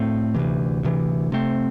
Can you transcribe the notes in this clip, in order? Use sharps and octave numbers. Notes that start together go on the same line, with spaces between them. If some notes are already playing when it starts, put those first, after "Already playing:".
Already playing: A2 A3 C4
D2 C3 E3
D2 C3 E3
C3 A3 C4